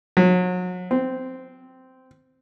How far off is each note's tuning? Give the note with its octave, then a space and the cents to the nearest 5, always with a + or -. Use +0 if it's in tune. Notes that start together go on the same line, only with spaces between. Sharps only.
F#3 -35
C4 -10